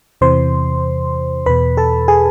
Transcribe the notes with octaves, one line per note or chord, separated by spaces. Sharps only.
E2 C3 E3 C5 C6
E2 B2 B4 B5
A4 A5
G#4 G#5